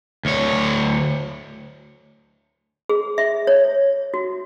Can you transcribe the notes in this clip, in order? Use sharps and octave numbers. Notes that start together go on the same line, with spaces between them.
D2 C#5
G#4
E5
C#5
F#4